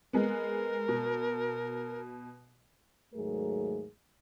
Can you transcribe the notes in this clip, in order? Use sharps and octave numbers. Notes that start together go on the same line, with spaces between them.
G#3 B3 A#4
B2
D#2 G#2 F#3 A3 G#4 A#4